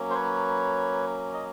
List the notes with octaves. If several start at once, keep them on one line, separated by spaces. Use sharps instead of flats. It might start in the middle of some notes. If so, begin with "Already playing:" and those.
Already playing: F#3 A#3 C#4
C5
B4 C#5
D#5